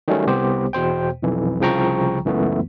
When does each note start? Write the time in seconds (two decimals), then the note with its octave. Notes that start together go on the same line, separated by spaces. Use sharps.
0.08 D#3 F#3 G3 A3 C#4
0.27 C2 B3 G4 C5
0.73 E2 B2 C5 G5
1.23 B1 F2 E3
1.60 C2 C#3 F3 G5 A#5 C#6
2.25 C#2 F#2 E3 A3 B3